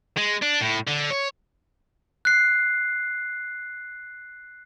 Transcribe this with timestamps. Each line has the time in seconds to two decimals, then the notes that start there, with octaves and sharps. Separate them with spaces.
0.18 G#3
0.42 D4
0.61 A2
0.87 D3
1.10 C#5
2.25 F#6 C7